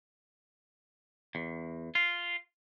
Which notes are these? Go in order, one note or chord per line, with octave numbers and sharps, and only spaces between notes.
E2
F4